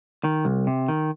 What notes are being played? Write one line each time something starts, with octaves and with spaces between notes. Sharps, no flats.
D#3
C2
C3
D#3